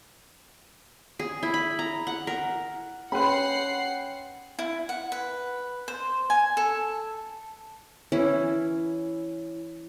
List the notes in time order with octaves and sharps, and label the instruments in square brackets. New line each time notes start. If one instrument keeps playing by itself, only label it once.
[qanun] G#4
E4
B5
A#5
F#5
A#4
[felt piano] C#4 G5 C6 [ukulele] B4 B5 [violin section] F#5 F#6 C7
[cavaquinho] E4
F#5
B4
C5
G#5
A4
[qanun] E3 C#4 E4